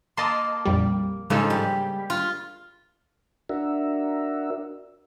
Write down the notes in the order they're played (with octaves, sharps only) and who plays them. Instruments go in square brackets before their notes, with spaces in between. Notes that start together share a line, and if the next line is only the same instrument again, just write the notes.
[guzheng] A#3 [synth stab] D#5 A5 C6
[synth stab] A#1 F2 G3
[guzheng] G#2 F3 [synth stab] C#3 G#3 A4
[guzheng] G3
F4
[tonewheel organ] D4 F#4 A#4 E5